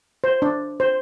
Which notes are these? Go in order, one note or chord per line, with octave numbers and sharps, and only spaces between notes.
C5
D4
C5